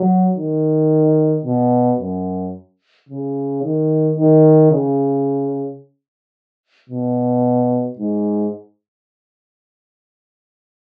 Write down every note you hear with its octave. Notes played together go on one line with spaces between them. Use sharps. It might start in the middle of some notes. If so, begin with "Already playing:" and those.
Already playing: F#3
D#3
B2
F#2
C#3
D#3
D#3
C#3
B2
G#2